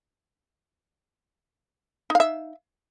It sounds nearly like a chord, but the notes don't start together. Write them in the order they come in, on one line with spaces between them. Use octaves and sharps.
D#4 F5 E5